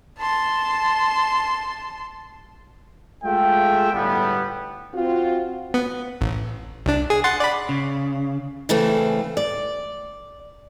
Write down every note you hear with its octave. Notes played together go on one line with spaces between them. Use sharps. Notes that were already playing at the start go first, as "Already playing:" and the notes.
A5 C6
G#3 A3 F4 G#4 E5 G5
G1 A2 G3 B3
C4 F4 F#4
B3
A1
C2 D4
G#4
F#5 C6 A6
D5 B5
C#3
C#3 E3 A3 C4
D5